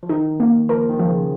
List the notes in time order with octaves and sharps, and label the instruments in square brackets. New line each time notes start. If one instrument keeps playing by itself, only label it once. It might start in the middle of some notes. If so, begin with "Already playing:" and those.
[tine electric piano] F3
[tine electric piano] D#3 [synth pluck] D#4
[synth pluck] A#3
[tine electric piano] F3 [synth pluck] A#4
[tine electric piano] D#3
[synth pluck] F3
[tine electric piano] C#3